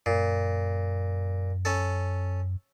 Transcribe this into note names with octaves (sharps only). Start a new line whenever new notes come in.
F#2 A#2
C#4 A4